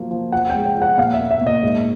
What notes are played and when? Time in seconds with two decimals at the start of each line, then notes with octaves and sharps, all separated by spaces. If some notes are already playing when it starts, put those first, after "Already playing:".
Already playing: F3 F#3 A#3
0.11 F3
0.32 F3 F#5
0.50 G5
0.55 G#3
0.66 G5
0.77 F3 F#5
0.98 A#2 F5
1.14 E5
1.20 A#3
1.31 E5
1.41 A#2
1.47 D#5
1.63 G#2